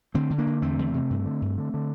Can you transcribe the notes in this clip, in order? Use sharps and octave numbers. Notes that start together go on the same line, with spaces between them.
D3 A3 C4
D3
A#3 D4
D3
E2 A3 C4
E2
C3
G2
D3
G2
D3
D3